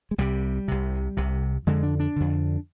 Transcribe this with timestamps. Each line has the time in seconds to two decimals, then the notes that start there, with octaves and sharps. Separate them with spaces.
0.11 G#3
0.18 C2 C3 G3
0.68 C2 C3
1.17 C2 C3
1.67 F2 D3 G#3
1.83 D4
2.00 D4
2.16 F2 D3